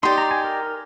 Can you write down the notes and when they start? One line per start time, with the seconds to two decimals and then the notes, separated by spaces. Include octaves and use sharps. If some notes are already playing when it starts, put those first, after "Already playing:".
0.03 D#4 G4 D5 C6
0.18 A#5
0.31 G#5
0.44 A#4 A#5